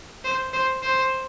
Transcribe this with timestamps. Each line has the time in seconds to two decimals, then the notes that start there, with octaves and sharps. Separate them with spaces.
0.24 C5
0.53 C5
0.83 C5